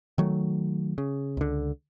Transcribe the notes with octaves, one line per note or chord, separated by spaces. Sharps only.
D#3 F#3 A3
C#3
C#2 D3